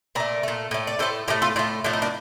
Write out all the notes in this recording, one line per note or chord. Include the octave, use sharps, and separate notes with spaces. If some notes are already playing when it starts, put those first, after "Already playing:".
A#2 A3 A#4 D5
A#2 A3
A2 A3
D5
A2 A3 A4 C5
A2 A3 G4 A#4
F4 A4
A2 A3 D4 F4
A2 F3 A3 D4
D#4
A#3 D4